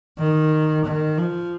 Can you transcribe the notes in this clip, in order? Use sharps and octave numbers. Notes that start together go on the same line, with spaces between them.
D#3
D#3
F3